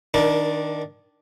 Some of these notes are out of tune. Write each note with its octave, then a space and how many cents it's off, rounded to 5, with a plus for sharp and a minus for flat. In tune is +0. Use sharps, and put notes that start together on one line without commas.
D#3 +0 D4 +0 A#4 +35